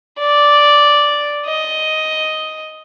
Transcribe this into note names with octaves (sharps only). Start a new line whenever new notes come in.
D5
D#5